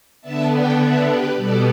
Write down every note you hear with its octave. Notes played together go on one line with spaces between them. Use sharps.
D3 B3 D4 E5 A5
D5 G5
B4 E5
G4 B4
B2 G3 B3 A4 D5